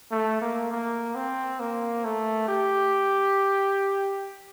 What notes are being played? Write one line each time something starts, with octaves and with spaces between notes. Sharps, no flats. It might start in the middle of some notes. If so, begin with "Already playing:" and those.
A3
A#3
A#3
C4
A#3
A3
G4